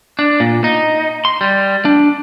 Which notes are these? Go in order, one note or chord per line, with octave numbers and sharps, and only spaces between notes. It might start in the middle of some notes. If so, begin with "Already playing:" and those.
D4
A#2
D#4
C6
G3
D4